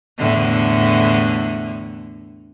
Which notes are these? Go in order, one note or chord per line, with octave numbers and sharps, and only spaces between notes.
E2 A2 D3